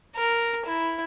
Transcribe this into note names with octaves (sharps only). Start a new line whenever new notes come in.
A#4
E4